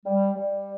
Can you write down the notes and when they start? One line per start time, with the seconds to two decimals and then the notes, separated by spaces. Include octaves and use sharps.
0.06 G3
0.36 G3